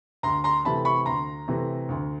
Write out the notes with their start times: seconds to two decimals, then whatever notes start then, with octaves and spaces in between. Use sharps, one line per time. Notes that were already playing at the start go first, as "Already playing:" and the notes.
0.23 D2 A#5 C6
0.44 A#5 C6
0.65 C3 E3 A3 A5 B5
0.85 B5 C#6
1.06 D2 A#5 C6
1.48 C3 E3 A3
1.89 D2